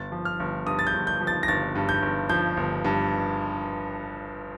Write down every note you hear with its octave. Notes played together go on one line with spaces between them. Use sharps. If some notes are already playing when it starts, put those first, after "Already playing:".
Already playing: G1 A6
F3
F6
G1
G2 D#6
A6
G6
G1
G6
F3
A6
A#6
G1 A6
G2
G6
G1
F3 G6
G1
G2